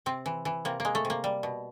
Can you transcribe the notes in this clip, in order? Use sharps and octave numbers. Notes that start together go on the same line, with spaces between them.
C3 C4
E3
E3
C3 A#3
G#3 A#3
A3
C3
A#3
G3
B2